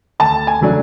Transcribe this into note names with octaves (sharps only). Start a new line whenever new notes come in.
D2 A5
G#5
C#3 F#3 A3 D4